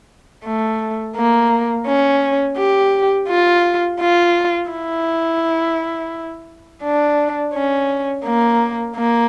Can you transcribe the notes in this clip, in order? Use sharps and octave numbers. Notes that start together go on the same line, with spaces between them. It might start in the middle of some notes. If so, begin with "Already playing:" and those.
A3
A#3
C#4
G4
F4
F4
E4
D4
C#4
A#3
A#3